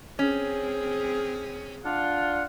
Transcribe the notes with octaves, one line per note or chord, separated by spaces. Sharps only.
C4 C#4 G#4
D4 F4 F#5